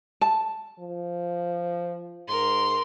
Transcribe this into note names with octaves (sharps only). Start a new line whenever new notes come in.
A5
F3
G#2 A#4 C6